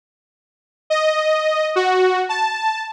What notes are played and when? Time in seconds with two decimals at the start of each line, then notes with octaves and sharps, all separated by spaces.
0.90 D#5
1.76 F#4
2.29 A5